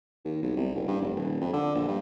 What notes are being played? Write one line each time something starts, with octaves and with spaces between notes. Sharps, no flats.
D#2
B1
C2
F#1
G2
F1
D#1
F2
D3
A#1
G2